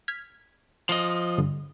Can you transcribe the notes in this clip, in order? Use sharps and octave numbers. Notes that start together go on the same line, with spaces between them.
F6 G#6 B6
F3 D#5
G2 D3